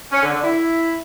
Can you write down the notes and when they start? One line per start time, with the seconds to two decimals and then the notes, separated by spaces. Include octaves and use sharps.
0.12 C#4
0.22 D3
0.33 D3
0.43 E4